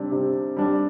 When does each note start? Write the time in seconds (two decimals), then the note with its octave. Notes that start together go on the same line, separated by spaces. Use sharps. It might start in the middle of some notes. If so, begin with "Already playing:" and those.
Already playing: C3 G3 D4
0.12 C3
0.57 G3 D4